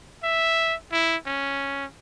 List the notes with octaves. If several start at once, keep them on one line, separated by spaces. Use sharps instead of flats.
E5
E4
C#4